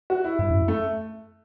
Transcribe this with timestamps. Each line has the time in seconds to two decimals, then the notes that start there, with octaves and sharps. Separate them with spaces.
0.10 F#4
0.24 E4
0.39 G2 E4
0.50 F#2
0.68 A3